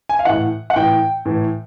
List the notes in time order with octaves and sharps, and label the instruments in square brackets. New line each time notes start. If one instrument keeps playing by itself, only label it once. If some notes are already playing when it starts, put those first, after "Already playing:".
[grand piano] G#5
F5
A2 E3 F#5
F#5
A2 E3 G5
A2 E3